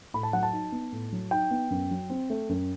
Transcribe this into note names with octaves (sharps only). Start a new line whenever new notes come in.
A2 B5
A5
F#3 F#5
A5
D#4
B3
A2
F#3
D#4 G5
B3
F#2
F#3
C4
A3
F#2